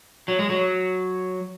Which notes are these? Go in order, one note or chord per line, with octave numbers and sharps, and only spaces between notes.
F#3
G#3
F#3